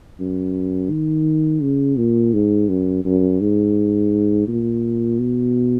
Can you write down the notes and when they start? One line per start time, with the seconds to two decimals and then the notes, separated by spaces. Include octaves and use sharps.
0.20 F#2
0.91 D#3
1.62 C#3
1.97 A#2
2.33 G#2
2.69 F#2
3.05 F#2
3.41 G#2
4.48 A#2
5.19 B2